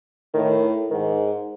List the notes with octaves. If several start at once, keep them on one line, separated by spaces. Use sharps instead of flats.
A2 D#3
G#2 D#3